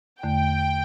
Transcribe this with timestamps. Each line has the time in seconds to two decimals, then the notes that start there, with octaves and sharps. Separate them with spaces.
0.23 E2 D3 A3 G5